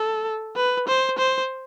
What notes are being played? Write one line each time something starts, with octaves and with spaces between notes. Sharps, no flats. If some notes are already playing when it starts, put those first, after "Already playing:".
Already playing: A4
B4
C5
C5